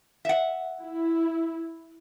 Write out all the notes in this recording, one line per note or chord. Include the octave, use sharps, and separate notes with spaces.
E5 F#5
E4